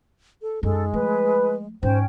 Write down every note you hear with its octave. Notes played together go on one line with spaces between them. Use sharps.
A4
F#2 G#3 D#4 A4
F3 A3 B4
G#2 C#4 C5 G5